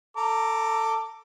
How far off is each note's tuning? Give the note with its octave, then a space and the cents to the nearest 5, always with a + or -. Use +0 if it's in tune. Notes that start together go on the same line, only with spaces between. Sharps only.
A4 +20 A#5 +0 D6 +0